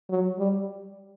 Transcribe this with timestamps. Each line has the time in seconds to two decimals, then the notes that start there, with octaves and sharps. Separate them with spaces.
0.10 F#3
0.39 G3